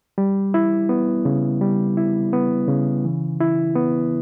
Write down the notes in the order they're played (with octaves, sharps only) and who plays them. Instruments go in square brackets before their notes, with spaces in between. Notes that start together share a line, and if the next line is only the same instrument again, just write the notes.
[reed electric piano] G3
E4
B3
C#3
G3
E4
B3
C#3
E3
E4
B3